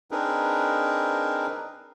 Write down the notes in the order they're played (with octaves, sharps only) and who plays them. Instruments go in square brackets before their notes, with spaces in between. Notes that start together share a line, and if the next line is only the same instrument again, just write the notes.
[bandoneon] C4 D4 D#4 G#4 A#4 B4